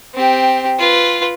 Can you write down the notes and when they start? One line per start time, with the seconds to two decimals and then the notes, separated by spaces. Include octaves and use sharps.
0.14 C4 G4
0.79 F4 B4